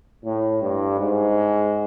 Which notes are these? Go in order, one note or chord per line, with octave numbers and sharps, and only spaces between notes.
A2
G2
G#2